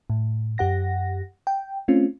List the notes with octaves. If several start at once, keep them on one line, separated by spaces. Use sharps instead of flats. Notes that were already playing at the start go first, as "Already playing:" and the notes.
A2
F#2 G4 F#5 A#6
G5
A3 C4 C#4 F4